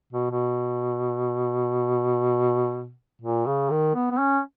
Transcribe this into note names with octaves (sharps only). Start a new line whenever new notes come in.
B2
B2
A#2
C#3
D#3
B3
B3
C#4